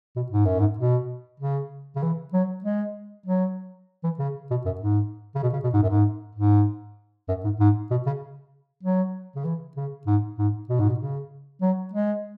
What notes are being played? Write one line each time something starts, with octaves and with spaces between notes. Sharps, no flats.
B2
G#2
F#2
G#2
B2
C#3
C#3
E3
F#3
G#3
F#3
E3
C#3
B2
F#2
G#2
C#3
B2
C#3
B2
G#2
F#2
G#2
G#2
F#2
G#2
G#2
B2
C#3
F#3
C#3
E3
C#3
G#2
G#2
B2
G#2
B2
C#3
F#3
G#3